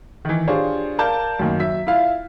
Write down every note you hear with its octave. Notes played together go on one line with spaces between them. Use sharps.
D#3 E3
D4 F4 G4 G#4 C5 C#5
A#4 D5 F5 A5 G6
F#2 D#3 A#3
F#3 E5 B6
E4 F4 E5 F5